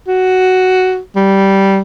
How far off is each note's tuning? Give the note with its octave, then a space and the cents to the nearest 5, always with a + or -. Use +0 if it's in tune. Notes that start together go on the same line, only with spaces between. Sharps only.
F#4 +5
G3 -10